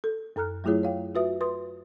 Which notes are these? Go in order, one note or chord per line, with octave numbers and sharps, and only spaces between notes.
A4
F#2 A4 A#5 F6 F#6
F#3 A3 E4 F4 G#4 C#5
C#5 F5 G5
F4 F#4 B4 E5 D#6
B4 C6 D#6